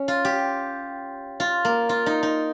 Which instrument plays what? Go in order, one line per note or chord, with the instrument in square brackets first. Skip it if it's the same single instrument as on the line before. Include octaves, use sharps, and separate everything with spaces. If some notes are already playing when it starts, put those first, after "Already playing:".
Already playing: [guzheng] C#4
F4
G4
F4
A#3
F4
D#4
D#4